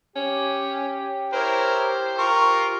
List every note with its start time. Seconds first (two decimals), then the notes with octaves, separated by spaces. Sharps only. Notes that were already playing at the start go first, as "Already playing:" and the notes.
0.16 C#4 G4
1.33 E4 A#4 C5 C#5
2.18 F4 A#4 C#6